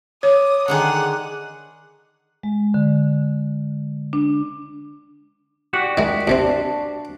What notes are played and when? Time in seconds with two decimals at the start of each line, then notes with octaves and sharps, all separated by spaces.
0.23 C#5 D6 D#6
0.68 D3 D#3 G#4 F#5
2.43 G#3
2.74 D3
4.13 D4
5.73 F#4 G4 D5 F#5
5.97 D#3 G#3
6.28 D#2 C3 C4 D4 F5 A5